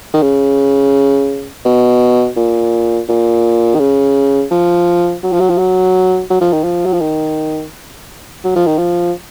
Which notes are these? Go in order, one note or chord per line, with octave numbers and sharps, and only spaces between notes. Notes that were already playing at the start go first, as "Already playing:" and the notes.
D#3
C#3
B2
A#2
A#2
D#3
C#3
F3
F#3
F3
F#3
F3
F#3
F#3
F3
D#3
F3
F#3
F3
D#3
F#3
F3
D#3
F3